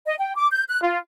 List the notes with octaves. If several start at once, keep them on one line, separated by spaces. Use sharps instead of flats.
D#5
G5
D6
G6
F#6
F4